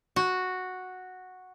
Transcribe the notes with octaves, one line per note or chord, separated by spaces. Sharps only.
F#4